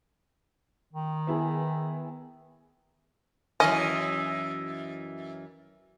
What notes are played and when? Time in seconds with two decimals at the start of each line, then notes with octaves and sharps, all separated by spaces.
0.93 D#3
1.27 B3 E4 G#4
3.60 F#2 E3 C#4 D#5